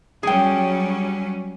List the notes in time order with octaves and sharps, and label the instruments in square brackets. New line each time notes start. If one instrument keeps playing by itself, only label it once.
[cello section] F#3 G3 C#4 [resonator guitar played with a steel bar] G#4 G5